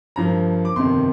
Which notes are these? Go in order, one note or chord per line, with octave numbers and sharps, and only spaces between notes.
G2 F3 A#3 A#5
D6
G1 F2 C3 D#3 C6